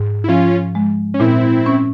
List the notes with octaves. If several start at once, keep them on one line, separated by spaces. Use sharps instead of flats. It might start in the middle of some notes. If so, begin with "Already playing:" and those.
Already playing: G#2
E4
F3 C#4 F4
G#3
C#4
A#2 C4 E4
C#4